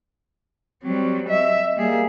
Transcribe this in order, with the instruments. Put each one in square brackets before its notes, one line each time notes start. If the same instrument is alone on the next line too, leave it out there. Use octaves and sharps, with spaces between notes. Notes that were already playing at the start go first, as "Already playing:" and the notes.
[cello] F#3 G3 [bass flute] C4
[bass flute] D#5 [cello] E5
[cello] G3 G#4 [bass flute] A#3